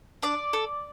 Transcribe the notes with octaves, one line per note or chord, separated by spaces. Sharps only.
D4 D5 D6
A4